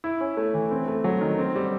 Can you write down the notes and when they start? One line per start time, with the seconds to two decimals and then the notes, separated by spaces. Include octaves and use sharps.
0.04 E4
0.21 C#4
0.37 A3
0.54 E3
0.71 C4
0.88 A3
1.04 F#3
1.21 D#3
1.38 C4
1.56 G3